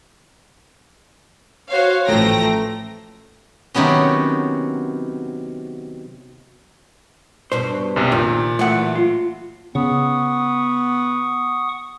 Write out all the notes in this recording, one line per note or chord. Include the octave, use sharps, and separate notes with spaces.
F#4 C5 C#5 F5
A1 F3 A3 G5 A#5 A#6
C3 D#3 F#3 B3 C#4
G2 B2 D4 C5
B1 F#2 C3
A#2 D#3
A2 E3 F#3 A3 F#5
F4
C#3 B3 F#5 C#6 D#6